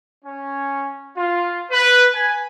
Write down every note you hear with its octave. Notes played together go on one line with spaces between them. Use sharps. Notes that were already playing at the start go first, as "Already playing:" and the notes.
C#4
F4
B4
G#5